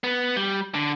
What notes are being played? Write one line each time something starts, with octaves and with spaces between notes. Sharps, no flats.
B3
G3
D3